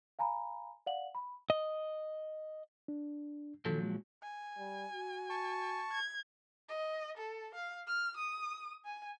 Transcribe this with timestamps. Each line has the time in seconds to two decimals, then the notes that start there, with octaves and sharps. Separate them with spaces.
0.19 F5 G#5 A#5 B5
0.86 D5 F5 F#5 F#7
1.15 B5
1.50 D#5
2.88 D4
3.65 A#2 D#3 F3 F#3 A4
3.83 G#3
4.23 G#5
4.58 G3
4.93 F#4
5.30 A5 C#6
5.91 G#6
6.69 D#5
7.17 A4
7.55 F5
7.87 F6
8.17 D#6
8.85 G#5